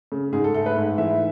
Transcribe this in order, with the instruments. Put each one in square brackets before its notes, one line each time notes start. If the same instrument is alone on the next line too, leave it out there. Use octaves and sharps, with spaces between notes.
[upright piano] C#3
G#2 G#4
A4
A3 A4
B4
G#2
E3 E5